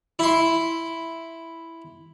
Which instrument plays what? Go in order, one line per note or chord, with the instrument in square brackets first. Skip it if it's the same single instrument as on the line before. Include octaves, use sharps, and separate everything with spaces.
[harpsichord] E4 C6